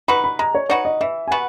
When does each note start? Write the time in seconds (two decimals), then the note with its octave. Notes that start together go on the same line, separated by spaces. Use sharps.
0.08 D#4 F#4 B4 B5
0.24 B5
0.39 G#3 A#5
0.55 C#5
0.69 D#4 F#4 B4 C#5
0.85 D#5
1.01 E3 E5
1.28 G#5
1.31 B3 F#4 B4 F#5